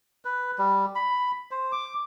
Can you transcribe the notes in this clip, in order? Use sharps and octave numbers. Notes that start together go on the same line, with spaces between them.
B4
G3
B5
C5
D6